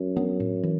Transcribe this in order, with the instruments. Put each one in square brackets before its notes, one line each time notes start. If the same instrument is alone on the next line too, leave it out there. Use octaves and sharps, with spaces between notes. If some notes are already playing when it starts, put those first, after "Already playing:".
Already playing: [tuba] F#2
[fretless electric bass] F#3 B3 D4
A2
E3